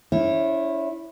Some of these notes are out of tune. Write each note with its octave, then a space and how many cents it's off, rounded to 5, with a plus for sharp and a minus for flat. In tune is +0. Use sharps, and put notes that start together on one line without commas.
C#4 +40 E4 +0 C#5 -35